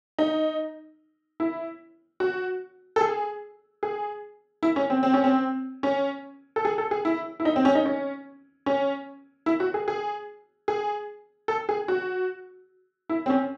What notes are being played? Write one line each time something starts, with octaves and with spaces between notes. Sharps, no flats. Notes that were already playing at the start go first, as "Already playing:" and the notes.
D#4
E4
F#4
A4
G#4
G#4
E4
C#4
C4
C4
C#4
C4
C#4
A4
G#4
A4
G#4
E4
E4
D#4
C4
C#4
D#4
C#4
C#4
E4
F#4
G#4
G#4
G#4
A4
G#4
F#4
E4
C4
C#4